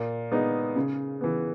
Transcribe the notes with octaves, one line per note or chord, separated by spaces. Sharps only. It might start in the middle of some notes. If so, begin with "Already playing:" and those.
Already playing: A#2
G#3 B3 D#4
C#3
E3 B3